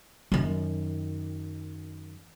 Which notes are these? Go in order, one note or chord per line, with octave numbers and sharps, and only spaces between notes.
F#2 D#3